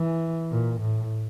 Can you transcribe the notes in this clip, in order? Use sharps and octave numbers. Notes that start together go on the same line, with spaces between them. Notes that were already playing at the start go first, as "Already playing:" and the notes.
Already playing: E3
A#2
A2